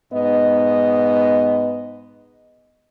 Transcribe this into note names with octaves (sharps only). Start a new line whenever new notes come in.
G#2 B3 D#5